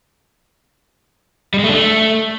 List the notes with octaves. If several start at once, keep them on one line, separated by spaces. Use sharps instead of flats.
G3
G#3
A3
D4
A3